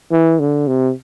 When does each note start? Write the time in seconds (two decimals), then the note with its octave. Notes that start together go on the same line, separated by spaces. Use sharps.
0.12 E3
0.40 D3
0.67 C3